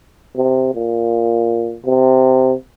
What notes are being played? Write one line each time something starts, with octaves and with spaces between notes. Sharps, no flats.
C3
A#2
C3